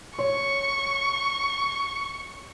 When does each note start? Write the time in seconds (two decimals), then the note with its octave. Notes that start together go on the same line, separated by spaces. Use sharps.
0.19 C#5 C#6